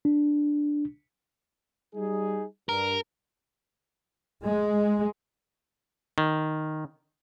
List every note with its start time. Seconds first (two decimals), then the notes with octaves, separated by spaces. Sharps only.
0.05 D4
1.95 G3 D#4 G#4
2.69 G2 A#4
4.45 G#3
6.18 D#3